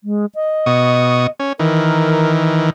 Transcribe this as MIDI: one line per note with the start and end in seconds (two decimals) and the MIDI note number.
0.04 0.25 56
0.35 1.29 75
0.66 1.27 47
0.66 1.27 85
0.66 1.27 87
1.40 1.53 61
1.59 2.70 51
1.59 2.70 52
1.59 2.40 70